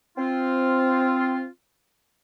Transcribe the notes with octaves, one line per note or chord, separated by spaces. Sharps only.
C4 F4